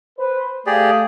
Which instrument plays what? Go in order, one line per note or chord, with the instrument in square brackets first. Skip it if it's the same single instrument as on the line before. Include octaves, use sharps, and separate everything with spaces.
[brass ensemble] B4 C5
[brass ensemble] A3 F5 [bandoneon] G4 G#4 D5